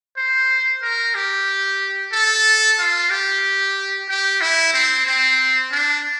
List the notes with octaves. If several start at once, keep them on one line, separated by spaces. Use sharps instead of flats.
C5
A#4
G4
A4
F4
G4
G4
E4
C4
C4
D4